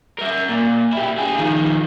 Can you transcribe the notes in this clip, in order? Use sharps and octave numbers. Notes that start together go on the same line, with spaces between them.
A#4 E5
A#2
E4 G4
F4 G#4
D#3 F3